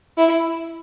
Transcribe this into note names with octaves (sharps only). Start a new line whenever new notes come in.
E4